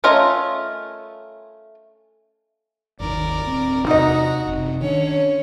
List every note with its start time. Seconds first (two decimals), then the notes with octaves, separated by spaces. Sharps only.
0.04 A3 C#4 F4 A#4 D#5
3.00 G1 D#2 D#3 A#4 D5
3.46 D1 C4
3.87 E2 C3 D#4 F#4 D#5 A#5
4.47 F#1 C3
4.81 D#3 C#4 D4 C#5